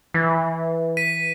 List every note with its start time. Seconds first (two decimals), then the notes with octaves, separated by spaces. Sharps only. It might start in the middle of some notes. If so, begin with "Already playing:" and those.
0.14 E3
0.97 B6 D#7